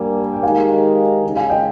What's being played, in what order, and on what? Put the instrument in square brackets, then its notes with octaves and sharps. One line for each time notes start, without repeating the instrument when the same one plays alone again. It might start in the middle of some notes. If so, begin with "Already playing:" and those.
Already playing: [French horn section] G2 G3 A#3 [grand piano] G#5
[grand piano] G5
[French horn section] D#3 G#3 D#4 G4 A#4 [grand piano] F5 G#5
[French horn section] D#2 C#3 G#3
[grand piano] F5 G#5
D#5 G5